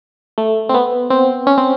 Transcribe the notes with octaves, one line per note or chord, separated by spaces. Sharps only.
A3
C4
B3
C4
C#4
C4